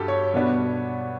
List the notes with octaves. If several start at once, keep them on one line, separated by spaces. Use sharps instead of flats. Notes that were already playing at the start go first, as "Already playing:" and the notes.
Already playing: G2 F#3 G4 A4
C#5
B2 G3 B3 D4